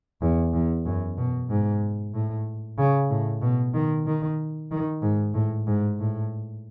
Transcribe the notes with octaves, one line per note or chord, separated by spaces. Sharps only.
E2
E2
F#2
B2
G#2
A2
C#3
A2
B2
D#3
D#3
D#3
G#2
A2
G#2
A2